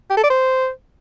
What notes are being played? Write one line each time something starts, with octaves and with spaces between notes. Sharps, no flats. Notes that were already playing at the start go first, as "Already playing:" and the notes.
G4
A4
D5
C5